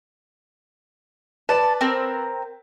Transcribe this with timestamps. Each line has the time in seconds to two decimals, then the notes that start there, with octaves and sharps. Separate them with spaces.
1.49 B4 D5 A5
1.81 C4 A#4